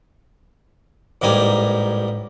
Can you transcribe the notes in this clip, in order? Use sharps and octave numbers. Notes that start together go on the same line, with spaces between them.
A1 G#2 G3 A#3 G#5